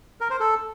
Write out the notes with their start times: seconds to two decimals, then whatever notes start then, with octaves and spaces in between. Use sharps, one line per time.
0.21 A#4
0.30 C5
0.40 A4